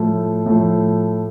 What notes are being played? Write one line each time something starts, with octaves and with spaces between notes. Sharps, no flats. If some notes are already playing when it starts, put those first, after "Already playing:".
Already playing: A2 F3 A3
A2 F3 A3